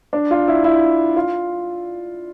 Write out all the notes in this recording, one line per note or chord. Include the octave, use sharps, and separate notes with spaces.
D4
F4
E4
E4
F4